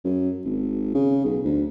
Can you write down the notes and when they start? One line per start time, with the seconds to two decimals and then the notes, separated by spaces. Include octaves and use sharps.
0.05 F#2
0.45 G#1
0.95 C#3
1.25 B1
1.45 D2